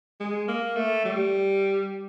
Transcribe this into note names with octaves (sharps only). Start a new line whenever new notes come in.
G#3
A#3
A3
G3